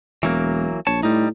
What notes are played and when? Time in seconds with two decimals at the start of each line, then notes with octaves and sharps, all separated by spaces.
0.23 E1 E3 F#3 A#3
0.87 A#1 C#5 A5
1.03 A2 G3 D#4